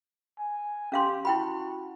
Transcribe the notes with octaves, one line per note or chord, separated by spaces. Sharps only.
G#5
C#4 G4 F5 C6
E4 F#4 G5 B5